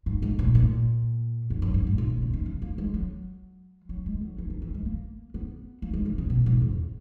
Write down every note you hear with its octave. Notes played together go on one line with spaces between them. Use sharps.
G#2
G#2
A#2
A#2
F#2
F#2
G#2
G#2
A#2
A#2
C#3
D#3
E3
A#3
G#3
F#3
F#3
G#3
F#3
E3
D#3
E3
G#3
A#3
B3
A#3
G#3
E3
C#3
B2
G#2
E2